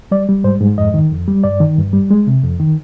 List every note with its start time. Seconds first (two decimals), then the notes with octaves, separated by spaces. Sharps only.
0.11 G3 D5
0.29 G3
0.44 G#2 C5
0.61 G#2
0.77 F2 D#5
0.94 D#3
1.11 F2
1.28 G3
1.44 G2 D5
1.60 D#3
1.78 G2
1.93 G3
2.11 G#3
2.27 C3
2.44 F2
2.60 D#3